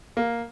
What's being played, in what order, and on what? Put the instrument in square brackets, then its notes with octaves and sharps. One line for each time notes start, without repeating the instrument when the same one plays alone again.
[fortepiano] A#3